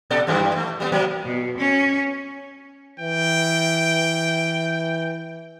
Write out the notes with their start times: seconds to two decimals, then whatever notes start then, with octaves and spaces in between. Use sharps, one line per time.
0.10 A#2 A4 D5
0.27 F#2 E3 G3
0.56 A3
0.80 G3 A#3 B3
0.92 C3 F#3 A#3
1.25 B2
1.58 C#4
3.00 E3 G5